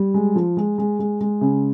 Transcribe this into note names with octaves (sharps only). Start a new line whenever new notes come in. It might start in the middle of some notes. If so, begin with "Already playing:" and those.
Already playing: G3
G#3
F3
G#3
G#3
G#3
G#3
C#3